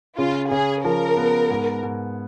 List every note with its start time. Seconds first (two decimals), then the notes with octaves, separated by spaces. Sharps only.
0.18 C#3 F4
0.51 C#3 G#4
0.84 F3 A#4
1.17 B3
1.50 G#2
1.83 G#2